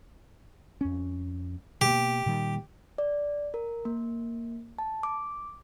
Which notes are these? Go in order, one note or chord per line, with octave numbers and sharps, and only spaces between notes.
F2 C#4
B2 A#3 G4
A#2 D#3 G3
D5
A#4
A#3
A5
D6